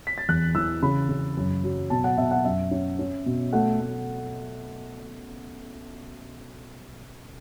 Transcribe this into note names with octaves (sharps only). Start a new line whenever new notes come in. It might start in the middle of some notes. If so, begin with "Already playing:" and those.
B6
A6
E2 F#6
E3 E6
C#3 B5
C#3
F#2
F#3
B2 A5
F#5
B2 E5
F#5
F#2 E5
C#4
C#4
B2
A3 F#5
A3